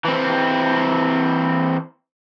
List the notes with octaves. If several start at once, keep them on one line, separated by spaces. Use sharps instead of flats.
E3 C4